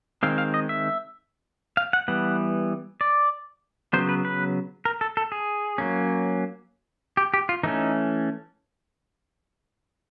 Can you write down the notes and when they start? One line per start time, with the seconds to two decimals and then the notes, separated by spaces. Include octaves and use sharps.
0.23 D#3 G#3 C4 F5
0.38 F5
0.54 D#5
0.69 E5
1.77 F5
1.93 F#5
2.08 E3 G3 B3 F#5
3.01 D5
3.93 C#3 F#3 B3 C5
4.09 B4
4.25 B4
4.85 A#4
5.01 A4
5.17 A4
5.32 G#4
5.78 F#3 A#3 C#4
7.17 G4
7.34 G4
7.49 F4
7.63 E3 A3 C#4 D#4